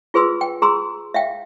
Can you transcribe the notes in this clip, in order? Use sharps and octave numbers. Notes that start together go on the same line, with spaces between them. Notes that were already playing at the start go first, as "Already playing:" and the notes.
F4 G#4 B4 C6 E6
G5
G#4 A#5 C6 E6
E5 F5 G5